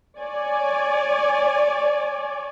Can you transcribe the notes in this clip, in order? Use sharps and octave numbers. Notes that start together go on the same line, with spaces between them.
C#5 D5 G#5